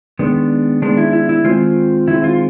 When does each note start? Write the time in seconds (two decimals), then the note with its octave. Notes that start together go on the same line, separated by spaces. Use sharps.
0.19 D#3 G#3 B3 D4
0.82 D#3 G#3 B3 D4
0.98 E4
1.13 E4
1.29 E4
1.45 D#3 G#3 C4 F4
2.08 D#3 G#3 C4 E4
2.24 F4